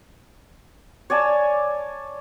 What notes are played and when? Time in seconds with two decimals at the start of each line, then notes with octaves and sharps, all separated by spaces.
1.10 C#5 D5 G#5 A5